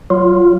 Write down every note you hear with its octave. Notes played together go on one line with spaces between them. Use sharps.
F#3 F4